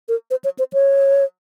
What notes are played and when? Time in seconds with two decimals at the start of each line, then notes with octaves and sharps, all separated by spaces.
0.09 A#4
0.31 C5
0.44 C#5
0.59 C5
0.73 C#5